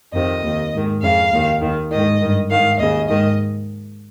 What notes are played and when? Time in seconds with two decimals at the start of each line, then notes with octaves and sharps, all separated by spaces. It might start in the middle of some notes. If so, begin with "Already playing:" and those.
0.14 F2 C3 D#3 D#5
0.43 D#2 D#3
0.74 G#2 D#3
1.02 F2 C#3 F5
1.33 D#2 D#3
1.61 D#2 D#3
1.91 G#2 D#3 D#5
2.21 G2 D#3
2.50 G#2 D#3 F5
2.79 D#2 C#3 D#5
3.08 G#2 D#3 D#5